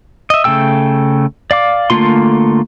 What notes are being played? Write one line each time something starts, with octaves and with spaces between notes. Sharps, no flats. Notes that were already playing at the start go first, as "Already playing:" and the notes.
D#5 E5
C#3 A3 A4 G5 E6
D5 F5 D6
D3 A3 A#3 F4 C6